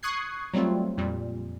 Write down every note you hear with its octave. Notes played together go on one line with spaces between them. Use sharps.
C#6 D#6 F#6 G#6 C7
F#3 G3 A3 C4 F4
F2 A#2 G3